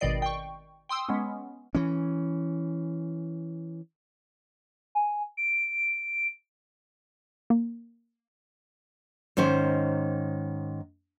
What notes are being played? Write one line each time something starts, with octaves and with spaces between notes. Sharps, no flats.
G#1 B2 D#3 D5 D#5 C7
G5 C#6
G5 C6 D#6 E6
G#3 B3 C#4
E3 C#4
G#5
D7
A#3
G#2 D#3 C#4 C5